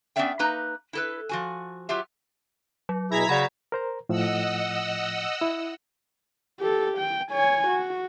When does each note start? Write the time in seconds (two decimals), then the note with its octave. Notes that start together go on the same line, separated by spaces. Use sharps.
0.16 B3 C#4 D4 D5 E5 G5
0.39 A#3 D#4 B4 A#5
0.93 E4 A4 B4
1.29 F3 F#4 G#5
1.89 F#3 F4 G4 E5
2.89 F#3
3.12 B2 E4 G#4 A#5 G#6 B6
3.29 C#3 F#4 D5 F#5 B5
3.72 A#4 C5 A#5
4.09 A2 F3 D#5 F#5 E6
5.41 E4
6.60 G4 A4
6.98 G5
7.32 C#5 G#5
7.68 F#4